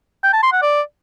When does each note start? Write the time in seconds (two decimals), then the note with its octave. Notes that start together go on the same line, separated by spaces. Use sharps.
0.24 G5
0.33 A5
0.43 C6
0.52 F#5
0.62 D5